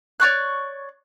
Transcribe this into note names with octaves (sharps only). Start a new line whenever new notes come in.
C#5 D5 C#6 F#6